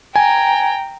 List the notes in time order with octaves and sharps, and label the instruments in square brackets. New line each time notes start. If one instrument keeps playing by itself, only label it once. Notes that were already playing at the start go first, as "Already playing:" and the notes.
[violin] G5 A#5 [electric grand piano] G#5